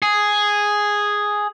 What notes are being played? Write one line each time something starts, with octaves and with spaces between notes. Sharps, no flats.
G#4